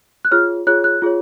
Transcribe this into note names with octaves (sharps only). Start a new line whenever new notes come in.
F#6
F4 G#4 C#5 F6
F4 G#4 C#5 F#6
F#6
F4 G#4 C#5